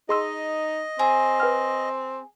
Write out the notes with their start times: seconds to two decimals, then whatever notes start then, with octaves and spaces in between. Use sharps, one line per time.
0.09 D#4 G#4 D#5 C6 E6
0.99 C4 G#4
1.40 B4 G5 F6